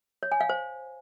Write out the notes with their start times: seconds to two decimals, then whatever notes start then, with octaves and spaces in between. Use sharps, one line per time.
0.23 C#5
0.32 G#5
0.41 F5
0.49 C5